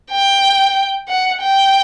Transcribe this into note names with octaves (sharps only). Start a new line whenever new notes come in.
G5
F#5
G5